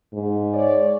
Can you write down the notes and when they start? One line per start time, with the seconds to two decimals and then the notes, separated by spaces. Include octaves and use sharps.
0.13 G#2
0.54 C#5 D5